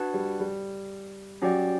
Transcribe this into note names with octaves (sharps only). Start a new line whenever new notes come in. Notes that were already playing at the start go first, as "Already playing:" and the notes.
Already playing: D4 F#4 B4 F#5 A5
G3
G3
F#3 C#4 G4 D5 G5